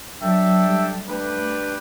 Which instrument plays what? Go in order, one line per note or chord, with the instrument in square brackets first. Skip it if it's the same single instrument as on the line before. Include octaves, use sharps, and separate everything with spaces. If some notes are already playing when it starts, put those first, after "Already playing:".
[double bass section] F#3 [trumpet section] D4 A4 E5 G5
[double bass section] G3
[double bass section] A3 [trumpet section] D4 G4 B4